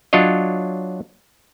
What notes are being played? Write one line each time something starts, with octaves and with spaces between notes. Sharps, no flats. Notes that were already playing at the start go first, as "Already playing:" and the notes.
F#3 D4 F4 C#5 D#5